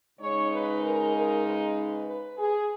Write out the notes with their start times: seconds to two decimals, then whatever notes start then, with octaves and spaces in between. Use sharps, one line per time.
0.19 C#3 G#3 D#4 C#5
0.51 B4
0.81 A#4
1.13 A#4
1.43 B4
2.06 B4
2.38 G#4